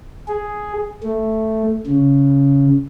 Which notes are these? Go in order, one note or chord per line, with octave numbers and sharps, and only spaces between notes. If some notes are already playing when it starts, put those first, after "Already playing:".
G#4
A3
C#3